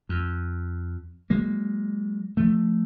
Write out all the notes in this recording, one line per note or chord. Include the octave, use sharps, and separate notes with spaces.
F2
F#3 G#3 A#3
F3 A3